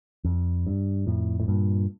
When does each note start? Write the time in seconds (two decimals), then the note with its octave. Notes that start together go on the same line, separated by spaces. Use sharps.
0.25 F2
0.67 G2
1.07 F2 A2
1.40 A2
1.48 G2 A#2